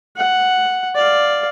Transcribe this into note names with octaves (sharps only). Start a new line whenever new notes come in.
F#5
D5 F5